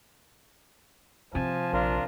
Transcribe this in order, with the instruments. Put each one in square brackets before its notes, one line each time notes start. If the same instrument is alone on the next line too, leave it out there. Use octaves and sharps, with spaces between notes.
[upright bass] C3 [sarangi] F3 [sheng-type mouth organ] G#5 A5
[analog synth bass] A#1 [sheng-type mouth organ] D4 F4 A#4